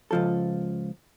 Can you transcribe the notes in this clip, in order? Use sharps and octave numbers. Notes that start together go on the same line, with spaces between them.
C#2 F3 A4